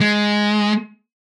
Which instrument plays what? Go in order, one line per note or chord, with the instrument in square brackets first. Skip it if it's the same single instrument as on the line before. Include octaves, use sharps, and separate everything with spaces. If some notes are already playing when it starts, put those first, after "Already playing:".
[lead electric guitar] G#3